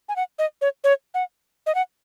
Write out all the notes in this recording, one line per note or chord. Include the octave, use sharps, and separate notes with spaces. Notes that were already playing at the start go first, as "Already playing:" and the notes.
G#5
F#5
D#5
C#5
C#5
F#5
D#5
F#5